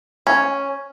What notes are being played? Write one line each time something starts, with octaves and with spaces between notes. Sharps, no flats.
C#4